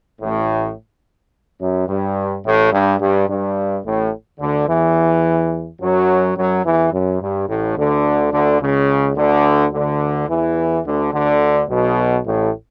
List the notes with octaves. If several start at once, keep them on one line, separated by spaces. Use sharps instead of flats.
A1 A2
F#2
G2
A1 A2
G2
G2
G2
A1 A2
D2 D3
E2 E3
F#2 F#3
F#2 F#3
E2 E3
F#2
G2
A1 A2
D2 D3
D2 D3
C#2 C#3
D2 D3
D2 D3
E2 E3
D2 D3
D2 D3
B1 B2
A1 A2